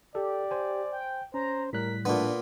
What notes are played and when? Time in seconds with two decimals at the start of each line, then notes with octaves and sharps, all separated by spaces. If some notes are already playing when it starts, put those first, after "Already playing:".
0.15 G4 A4 D5
0.51 C5 G#5
0.92 G5
1.34 C#4 C5 A#5
1.73 A2 G3 A#4 F#6 B6
2.05 A#2 A3 B3 D4